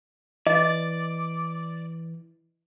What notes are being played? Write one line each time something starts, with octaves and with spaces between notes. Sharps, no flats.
E3 D5 D#5